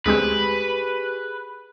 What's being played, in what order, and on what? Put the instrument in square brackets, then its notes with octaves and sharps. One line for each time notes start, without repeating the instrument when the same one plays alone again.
[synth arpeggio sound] D2 G#3 C4 [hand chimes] G4 G#4 [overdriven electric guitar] B4